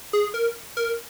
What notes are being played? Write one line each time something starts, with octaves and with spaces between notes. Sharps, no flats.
G#4
A#4
A#4